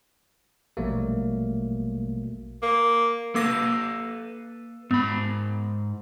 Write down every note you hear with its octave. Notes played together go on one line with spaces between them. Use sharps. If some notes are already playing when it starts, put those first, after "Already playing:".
A#1 B2 F#3 G3 A3 A#3
A#3
A#3 A4 B4 F5 D6 A#6
G#2 B3 B5